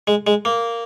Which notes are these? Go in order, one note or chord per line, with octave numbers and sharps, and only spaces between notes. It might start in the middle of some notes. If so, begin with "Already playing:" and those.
G#3
G#3
A#3